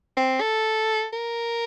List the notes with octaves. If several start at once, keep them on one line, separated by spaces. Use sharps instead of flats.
C4
A4
A#4